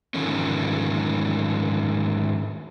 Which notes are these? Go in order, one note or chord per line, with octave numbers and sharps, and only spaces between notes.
G#2 D3 D#3 F3 A3 C#4